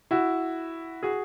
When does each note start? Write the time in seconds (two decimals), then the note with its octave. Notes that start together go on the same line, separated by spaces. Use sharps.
0.11 E4 F#4
1.03 F#4 G#4